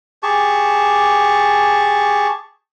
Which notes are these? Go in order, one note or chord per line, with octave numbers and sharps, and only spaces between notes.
G4 G#4 A5 C#6